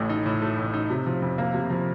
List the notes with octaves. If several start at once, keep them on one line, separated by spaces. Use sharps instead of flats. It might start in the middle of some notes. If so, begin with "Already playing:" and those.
Already playing: A1 A2 A3
D#4
A2
A3
A1
D#4
C3
F3
F2
A#3
C3
F3